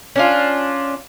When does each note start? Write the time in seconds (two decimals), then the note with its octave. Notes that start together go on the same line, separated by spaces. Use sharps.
0.16 C#4 D4 F4